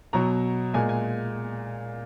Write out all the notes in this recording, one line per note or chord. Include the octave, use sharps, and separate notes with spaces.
B2 F#3 A#5
A#2 G#3 G#5
G#5